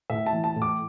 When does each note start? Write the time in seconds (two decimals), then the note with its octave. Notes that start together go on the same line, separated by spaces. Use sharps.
0.10 A2 E5
0.26 A5
0.33 E3
0.44 A5
0.56 A2
0.62 D6